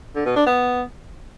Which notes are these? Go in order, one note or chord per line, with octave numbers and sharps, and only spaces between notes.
D3
B2
D4
B3